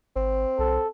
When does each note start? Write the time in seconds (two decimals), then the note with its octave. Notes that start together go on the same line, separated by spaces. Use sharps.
0.16 G#1 C4
0.59 B1 A4